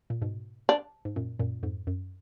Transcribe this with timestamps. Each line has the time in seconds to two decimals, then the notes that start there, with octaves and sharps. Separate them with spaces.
0.10 A#2
0.22 G#2 B2
0.69 D4
1.05 G#2
1.16 F#2 A#2
1.39 F#2 A#2
1.63 F2 G#2
1.87 F#2